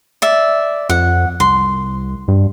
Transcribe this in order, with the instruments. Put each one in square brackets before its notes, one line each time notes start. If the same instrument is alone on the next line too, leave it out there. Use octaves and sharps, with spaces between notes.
[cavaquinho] D5 E5
[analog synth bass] F2 [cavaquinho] F#5
[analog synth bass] C2 [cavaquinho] C6
[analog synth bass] G2